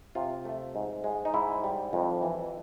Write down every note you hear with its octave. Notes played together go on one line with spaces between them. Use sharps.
C3 F4
A3
G#2
G#3
D#4
G#2 E4
G3
F2
E3